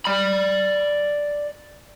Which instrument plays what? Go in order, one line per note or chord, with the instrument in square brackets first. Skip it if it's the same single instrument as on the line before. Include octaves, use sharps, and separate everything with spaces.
[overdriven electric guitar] D5 B5